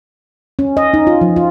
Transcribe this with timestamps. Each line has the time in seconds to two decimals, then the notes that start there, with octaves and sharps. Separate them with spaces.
0.59 C#4
0.77 D#5
0.94 D#4
1.07 F4
1.21 F3
1.36 F4